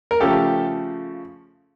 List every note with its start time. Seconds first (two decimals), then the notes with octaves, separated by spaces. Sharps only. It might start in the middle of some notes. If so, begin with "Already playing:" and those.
0.11 A#4
0.20 C#3 F3 A3 G4 A4